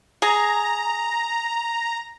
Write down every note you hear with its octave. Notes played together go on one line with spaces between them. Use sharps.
G#4 A#5